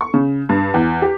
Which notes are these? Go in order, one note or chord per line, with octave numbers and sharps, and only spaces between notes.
C#6
C#3
G2
E2
G4